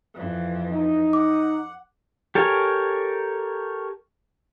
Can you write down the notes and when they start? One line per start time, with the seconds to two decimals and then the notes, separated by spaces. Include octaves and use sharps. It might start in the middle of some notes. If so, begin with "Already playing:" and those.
0.15 F2 E3
0.72 D#4
1.13 F#5 D6
2.35 G4 A4 A#4 C#5 G#5